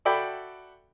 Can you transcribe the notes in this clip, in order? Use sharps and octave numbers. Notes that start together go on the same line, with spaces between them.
F#4 A4 D5 E5 G5 B5